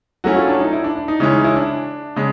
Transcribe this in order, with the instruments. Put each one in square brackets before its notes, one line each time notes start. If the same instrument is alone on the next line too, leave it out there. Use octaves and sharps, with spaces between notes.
[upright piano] F#3 A3 C#4 E4 [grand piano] F#4
[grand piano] F4
D4
D#4
E4
D4
D4
D#4
[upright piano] C#3 E3 G#3 C#4 [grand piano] E4
[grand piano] D#4
E4
D4
[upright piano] C#3 G#3